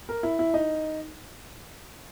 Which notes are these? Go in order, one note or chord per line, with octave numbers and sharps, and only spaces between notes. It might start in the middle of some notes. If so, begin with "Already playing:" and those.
A#4
E4
E4
D#4